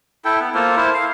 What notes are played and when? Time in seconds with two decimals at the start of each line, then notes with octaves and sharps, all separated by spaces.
0.25 E4 A4 G5
0.40 B3
0.55 A#3 F4 A4 C5
0.76 E4 C5
0.94 F5